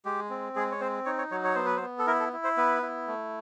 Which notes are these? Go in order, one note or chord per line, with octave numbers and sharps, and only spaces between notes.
G#3 G4
C4
G#3 G#4
C#5
C4 C5
D#4 C#5
C#5
F#3 C#5
C#5
B3 C5
B4
C5
B3
A4
E4 A#4
A4
E4
C5
B3 B4
E4
A3